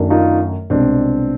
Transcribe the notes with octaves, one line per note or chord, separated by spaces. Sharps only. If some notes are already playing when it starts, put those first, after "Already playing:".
Already playing: F#2 D#3 F#3 A3 D4
D#4 F4
C2 B2 G#3 C4 D4